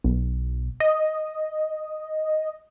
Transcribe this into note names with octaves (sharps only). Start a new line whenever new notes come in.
B1
D#5